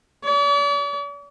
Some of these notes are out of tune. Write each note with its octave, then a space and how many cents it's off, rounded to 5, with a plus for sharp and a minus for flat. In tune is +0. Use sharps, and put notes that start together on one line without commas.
D5 -45